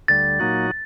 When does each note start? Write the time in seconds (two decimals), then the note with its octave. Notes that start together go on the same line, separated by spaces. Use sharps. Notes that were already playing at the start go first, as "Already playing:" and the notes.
0.08 D2 D3 G3 A6
0.40 A#2 F#3 A#3 D#4 F#4